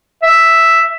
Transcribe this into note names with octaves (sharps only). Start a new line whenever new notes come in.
E5